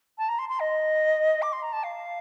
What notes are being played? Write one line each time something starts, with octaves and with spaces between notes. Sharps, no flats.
A5
A#5
C6
C6
D#5
D6
C6
A#5
A5
F5